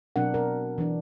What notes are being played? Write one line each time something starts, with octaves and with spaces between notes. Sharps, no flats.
B2 F#3 C4 D4 A#4 F#5
A#4
E3 D4